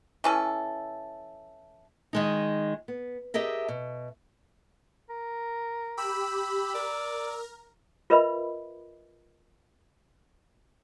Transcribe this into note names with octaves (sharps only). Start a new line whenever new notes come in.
E3 C#4 A4
D#3 G#3 D#4
B3
G4 G#4 A#4 D#5 E5
B2
A#4
G4 B5 E6
A#4 D5
F4 A#4 B4 D#5 E5 B5